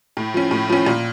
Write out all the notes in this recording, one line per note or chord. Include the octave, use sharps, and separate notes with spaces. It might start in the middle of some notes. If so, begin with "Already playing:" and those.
A2
F3 C#4
A2
F3 C#4
A#2